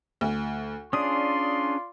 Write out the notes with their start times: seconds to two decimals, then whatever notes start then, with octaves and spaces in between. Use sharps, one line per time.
0.21 D2
0.93 C#4 D4 F4 G#4 D5 C6 D#6